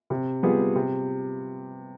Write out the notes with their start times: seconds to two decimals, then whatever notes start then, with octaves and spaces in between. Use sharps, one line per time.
0.10 C3
0.43 G3 B3 F4 G#4
0.75 C3